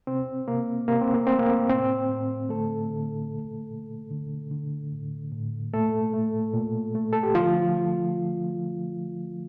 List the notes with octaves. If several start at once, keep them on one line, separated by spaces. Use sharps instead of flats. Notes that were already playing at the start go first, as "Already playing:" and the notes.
C3 C4
C3 A#3
C3 A#3
C4
A#3
A3 C4
A#3
A2 C4
A2
D3 A3 A4
D3
A#2
A#2
D3
D3
A2
A2
A#2 A3 A4
A3
A#2
A3
A4
G4
D3 F3 F4